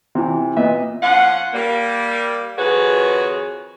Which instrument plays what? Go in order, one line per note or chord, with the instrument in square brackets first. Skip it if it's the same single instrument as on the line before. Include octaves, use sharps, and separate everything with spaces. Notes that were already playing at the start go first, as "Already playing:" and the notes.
[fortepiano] C3 E3
A#2 B3 D#5 E5
[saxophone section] F3 C#4 F4 F#5
G3 A#3
F2 D#3 F#4 G#4 B4 C#5